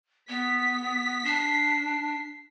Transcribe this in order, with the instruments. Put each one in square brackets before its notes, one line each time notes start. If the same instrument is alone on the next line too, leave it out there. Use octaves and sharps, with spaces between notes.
[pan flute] B3 [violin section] B6
[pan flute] D4 [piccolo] C7